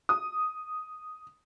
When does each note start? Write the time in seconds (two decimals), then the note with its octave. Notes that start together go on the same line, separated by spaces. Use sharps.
0.09 D#6